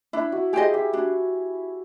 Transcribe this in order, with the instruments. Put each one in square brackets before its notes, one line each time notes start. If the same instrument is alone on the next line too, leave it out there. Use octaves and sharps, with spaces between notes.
[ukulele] D4 [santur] E4
[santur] F#4
[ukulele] G4 C5 D#5 [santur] G#4
[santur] G4
[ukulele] D4 [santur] F#4